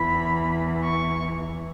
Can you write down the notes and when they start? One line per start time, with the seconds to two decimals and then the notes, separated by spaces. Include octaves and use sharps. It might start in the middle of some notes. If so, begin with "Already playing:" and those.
Already playing: E2 E3 B5
0.83 C#6